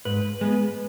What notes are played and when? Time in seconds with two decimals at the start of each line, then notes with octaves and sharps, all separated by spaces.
0.05 G#2 B4
0.41 G#3 B3